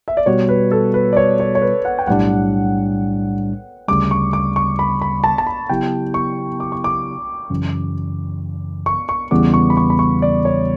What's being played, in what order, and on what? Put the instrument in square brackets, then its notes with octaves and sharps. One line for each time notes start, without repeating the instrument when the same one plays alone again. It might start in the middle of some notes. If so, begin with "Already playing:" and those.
[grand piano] E5
D5
[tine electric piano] B2 G3 B3 F#4 [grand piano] C#5
[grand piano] B4
A4
B4
D5
C#5
C#5
C#5
B4
F#5
G5
[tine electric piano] B1 A2 G3 D4 [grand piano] F#5
[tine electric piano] D2 C#3 G3 [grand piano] D6
[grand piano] C#6
D6
C#6
B5
B5
A5
A5
B5
[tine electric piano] C#3 F#3 B3 E4 G4 [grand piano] G5
[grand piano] C#6
D6
C#6
D6
[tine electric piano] F#2 C#3 E3
[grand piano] C#6
C#6
[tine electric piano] E2 C#3 E3 G3 B3 [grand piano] D6
[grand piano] C#6
B5
C#6
B5
C#6
D5
C#5